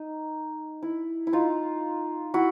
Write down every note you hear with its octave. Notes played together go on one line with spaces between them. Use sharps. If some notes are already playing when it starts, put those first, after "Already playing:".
Already playing: D#4
E4
E4
D#4 F4
E4 F#4